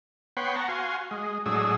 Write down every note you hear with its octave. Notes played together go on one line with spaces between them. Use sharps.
B3 C#5 F#5 G5 B5 C6
F#5 A5 A#5 C#6
F#4 F5 G#5 C6
G#3
A2 F#3 G#3 D4 G#4 E6